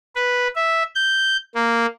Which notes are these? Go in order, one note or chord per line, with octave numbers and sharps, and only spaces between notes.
B4
E5
G6
A#3